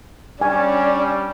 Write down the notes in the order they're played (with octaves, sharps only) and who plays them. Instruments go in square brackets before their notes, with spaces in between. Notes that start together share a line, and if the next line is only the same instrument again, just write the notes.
[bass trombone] G3 [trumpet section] C#4 [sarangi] D4 [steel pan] G#5